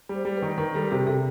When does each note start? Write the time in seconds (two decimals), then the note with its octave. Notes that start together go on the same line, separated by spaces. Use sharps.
0.09 G3
0.15 C5
0.25 G3
0.37 B4
0.42 D#3
0.58 D#3 A#4
0.75 G3 A4
0.91 C3 G#4
1.06 C3 A4